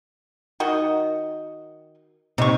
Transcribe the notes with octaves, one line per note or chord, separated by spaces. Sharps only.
D#3 F#4 D#5
C3 D#4 C#6